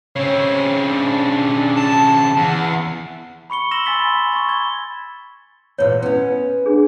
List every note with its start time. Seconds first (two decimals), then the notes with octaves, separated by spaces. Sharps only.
0.16 C#3 C4 C#5
0.88 D4
1.77 A5
2.37 E2 F#5
3.50 B5 C#6 C#7 G7
3.71 C6 E6 A#6 E7 F#7 G7
3.86 G#5 E6 A6 B6 G7
4.00 B5 A6
4.32 C#6 A6
4.49 G#6 G7
5.78 E2 A#2 C#5 E6
6.02 B3 C#4
6.66 D4 G#4